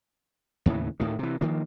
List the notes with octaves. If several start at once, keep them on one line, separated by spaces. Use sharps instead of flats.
D#2 A2 C#3 E3
D2 A2 D#3
C3 E3
D#3 F3 A#3